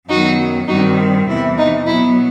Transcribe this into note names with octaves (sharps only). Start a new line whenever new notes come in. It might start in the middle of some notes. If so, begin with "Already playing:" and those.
F#2 D#3 F#3 B3 D#4 F#4
G2 D#3 G3 C4 D#4 F#4
E2 C3 E3 E4
D#4
B2 F#3 B3 E4